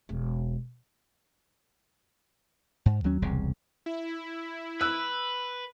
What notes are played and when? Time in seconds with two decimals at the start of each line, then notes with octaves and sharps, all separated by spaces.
0.09 E1
2.86 G#2
3.04 D#2 F#3 C#4
3.22 E1 C2 C#3
3.86 E4
4.81 B4 E6 F#6